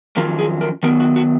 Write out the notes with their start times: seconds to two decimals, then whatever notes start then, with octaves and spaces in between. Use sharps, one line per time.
0.16 F2 D#3 F#3 C#4 F4 A#4
0.39 G#4
0.61 A#4
0.83 D#3 F#3 B3 A#4
1.00 F#4
1.16 F#4